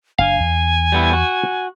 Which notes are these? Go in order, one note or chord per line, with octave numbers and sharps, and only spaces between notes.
F#1 D4 F5 G#5
E2
G3 B3 E4
F#4